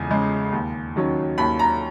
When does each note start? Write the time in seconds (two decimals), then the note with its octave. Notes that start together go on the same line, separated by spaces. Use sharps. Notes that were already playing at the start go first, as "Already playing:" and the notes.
Already playing: E2 C#3 G#3 G#5
0.10 C#3 G#3
0.52 D#2
0.96 D#3 F#3 C#4
1.38 D#2 B5
1.59 A#5